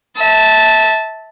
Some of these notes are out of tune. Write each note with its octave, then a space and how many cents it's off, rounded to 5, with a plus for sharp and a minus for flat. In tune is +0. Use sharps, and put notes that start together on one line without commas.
E5 -20 A5 +0